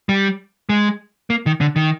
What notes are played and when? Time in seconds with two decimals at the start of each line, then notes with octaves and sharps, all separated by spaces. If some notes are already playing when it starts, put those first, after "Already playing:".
0.09 G3
0.69 G#3
1.30 A#3
1.46 D#3
1.61 D3
1.76 D#3